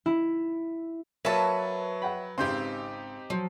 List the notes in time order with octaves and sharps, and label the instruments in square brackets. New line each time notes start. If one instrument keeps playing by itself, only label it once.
[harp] E4
[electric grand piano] F#3 C#6 A6 [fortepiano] A#3 [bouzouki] B4 A5 [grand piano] C#5 E5
[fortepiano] F#5 G5 B5
[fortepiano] G#1 C#3 [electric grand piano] C4 D#4 G4 [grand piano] C6 G6
[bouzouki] F3 [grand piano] F#3